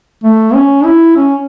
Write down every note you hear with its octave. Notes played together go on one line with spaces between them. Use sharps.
A3
C#4
E4
C#4